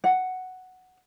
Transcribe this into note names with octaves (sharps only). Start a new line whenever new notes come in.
F#5